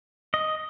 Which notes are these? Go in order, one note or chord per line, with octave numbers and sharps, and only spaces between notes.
D#5